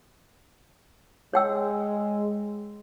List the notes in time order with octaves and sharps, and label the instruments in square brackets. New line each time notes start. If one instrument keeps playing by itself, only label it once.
[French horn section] G#3 [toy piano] C#5 G5 E6